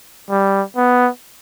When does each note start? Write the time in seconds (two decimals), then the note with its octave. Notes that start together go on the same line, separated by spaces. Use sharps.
0.30 G3
0.76 B3